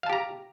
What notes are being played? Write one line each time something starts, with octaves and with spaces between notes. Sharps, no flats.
G4 F5 A5 A#5